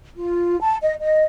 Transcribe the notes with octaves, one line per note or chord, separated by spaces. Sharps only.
F4
A5
D#5
D#5